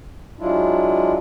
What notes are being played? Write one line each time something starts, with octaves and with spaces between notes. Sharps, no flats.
F#3 G#3 D4 E4 F4